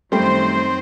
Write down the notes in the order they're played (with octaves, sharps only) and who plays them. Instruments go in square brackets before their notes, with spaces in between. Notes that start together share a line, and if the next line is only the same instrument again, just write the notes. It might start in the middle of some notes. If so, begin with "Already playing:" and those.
[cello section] F#2 D#3 C5 [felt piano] G3 A3 G5 [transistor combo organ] C4